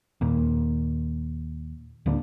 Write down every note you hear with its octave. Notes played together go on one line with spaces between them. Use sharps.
D#2 A#2
D1 D3 A#3 D4